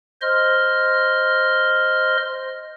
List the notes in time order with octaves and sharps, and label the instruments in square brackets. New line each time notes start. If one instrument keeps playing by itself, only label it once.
[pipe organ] C5 D#5 C6 F6